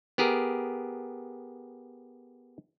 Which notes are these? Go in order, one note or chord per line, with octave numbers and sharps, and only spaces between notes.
B3 G4 G#4 A#4